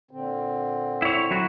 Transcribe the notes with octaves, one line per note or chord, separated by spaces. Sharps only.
A#2 D3 C4
E4 C#5
F#3 E4 F#4